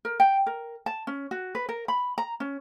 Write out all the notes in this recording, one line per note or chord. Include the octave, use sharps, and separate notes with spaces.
A#4
G5
A#4
A5
C#4
F#4
B4
A#4
B5
A#5
C#4